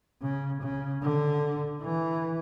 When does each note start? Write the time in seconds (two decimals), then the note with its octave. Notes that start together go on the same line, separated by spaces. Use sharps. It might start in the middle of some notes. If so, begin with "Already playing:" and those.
0.22 C#3
0.62 C#3
1.03 D3
1.83 E3